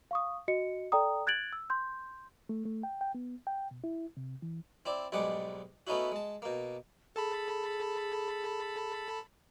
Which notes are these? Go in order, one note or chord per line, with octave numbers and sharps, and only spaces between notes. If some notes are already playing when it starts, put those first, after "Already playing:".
F5 C#6 D#6
F#4 D#5 C#7
A4 D5 G5 A#5 D#6
F#6 G#6 A6 D7 F#7
E6
C6 G6
A3
A3
G5
G5
B3
G5
B2
E4
C3
E3
C4 E4 D5
B1 G#2 G3 G#3 F#5 D6
A3 B3 C#4 D#4 E4 F#4
G#3 A5
B2 A#3
G#4 A4 A5 B5